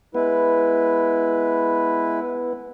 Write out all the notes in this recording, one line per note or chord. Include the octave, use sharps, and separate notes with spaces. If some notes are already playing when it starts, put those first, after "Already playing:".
G#3 B3 E4 B4